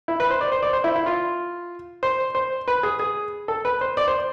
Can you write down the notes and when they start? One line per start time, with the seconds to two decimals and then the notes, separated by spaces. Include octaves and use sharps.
0.08 E4
0.20 B4
0.30 C5
0.41 D5
0.52 C5
0.63 D5
0.73 C5
0.84 E4
0.96 E4
1.06 F4
2.03 C5
2.35 C5
2.68 B4
2.83 G#4
2.99 G#4
3.48 A4
3.65 B4
3.81 C5
3.97 D5
4.08 C5